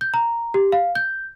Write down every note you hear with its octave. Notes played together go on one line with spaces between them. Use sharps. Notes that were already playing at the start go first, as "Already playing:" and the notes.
G6
A#5
G4
F5
G6